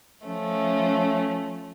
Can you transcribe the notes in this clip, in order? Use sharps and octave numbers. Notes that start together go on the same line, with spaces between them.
F3 A3 C#4